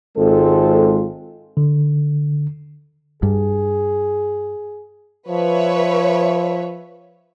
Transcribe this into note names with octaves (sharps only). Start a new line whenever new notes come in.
G#1 G#3 C4 F4 A4
D3
G2 G#4
F3 B4 C#5 E5